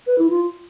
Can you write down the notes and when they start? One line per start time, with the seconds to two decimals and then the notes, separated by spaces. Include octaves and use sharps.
0.06 B4
0.18 E4
0.30 F4